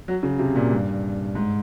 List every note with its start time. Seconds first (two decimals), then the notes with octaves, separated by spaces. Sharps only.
0.08 F#3
0.23 C#3
0.39 C3
0.55 A#2
0.71 G2
1.35 G#2